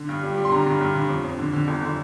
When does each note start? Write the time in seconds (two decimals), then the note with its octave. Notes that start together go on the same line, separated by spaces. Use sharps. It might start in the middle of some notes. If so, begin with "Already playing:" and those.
Already playing: D3
0.09 G2
0.23 G3
0.37 G3
0.45 C6
0.52 D3 A#5
0.67 G2
0.81 G2
0.95 D3
1.09 F2
1.24 F2
1.39 D3
1.53 D3
1.68 G1
1.82 D3